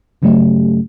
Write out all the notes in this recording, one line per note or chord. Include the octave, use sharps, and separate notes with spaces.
G2 C#3 F#3 A3 C#4 G4